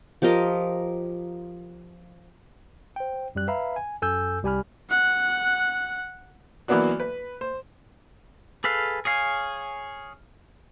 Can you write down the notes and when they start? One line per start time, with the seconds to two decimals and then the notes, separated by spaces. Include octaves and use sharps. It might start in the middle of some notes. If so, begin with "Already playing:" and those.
0.22 F3 G4 A#4 D#5
2.96 C5 G5
3.35 F#2 G3 F#6
3.48 B4 E5 F5 A#5 B5
3.76 G#5
4.02 F#2 A4 G#5 E6 G6
4.43 C2 G3 G4 G#5 B5 F6
4.90 F#5 F#6
6.68 E3 F#3 A#3 B3 D4 F#4
7.00 B4
7.41 C5
8.64 G#4 A4 B4 F5
9.05 G#4 C#5 F5 G#5